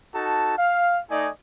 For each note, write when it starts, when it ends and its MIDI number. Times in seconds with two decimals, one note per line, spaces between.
0.14 0.54 63
0.14 0.54 66
0.14 0.54 69
0.14 0.54 81
0.58 0.99 77
1.11 1.30 57
1.11 1.30 63
1.11 1.30 74
1.11 1.30 75
1.11 1.30 80